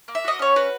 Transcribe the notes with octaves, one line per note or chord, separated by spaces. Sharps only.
A#3
E5
F#4 D#5
C#4 C#5
F#4 B4